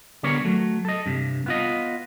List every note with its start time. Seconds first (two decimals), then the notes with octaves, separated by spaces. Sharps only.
0.23 D3 G3 B3 A#4 C#5
0.45 F#3 A3
0.85 A4 D#5
1.06 G2 C3
1.46 B3 F4 D#5